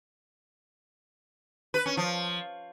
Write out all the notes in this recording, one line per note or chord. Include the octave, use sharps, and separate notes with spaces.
B4
C#4
F3